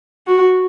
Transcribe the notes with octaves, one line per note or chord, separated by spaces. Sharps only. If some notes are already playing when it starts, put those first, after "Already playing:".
F#4